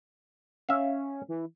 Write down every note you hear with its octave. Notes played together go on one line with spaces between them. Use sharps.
C#4 E5 F5
E3